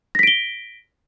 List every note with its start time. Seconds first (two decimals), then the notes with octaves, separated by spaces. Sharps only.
0.15 A#6
0.19 B6
0.23 D7
0.27 G7